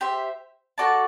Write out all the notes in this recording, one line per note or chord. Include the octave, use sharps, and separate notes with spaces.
G4 C5 E5
F#4 A4 D5 A5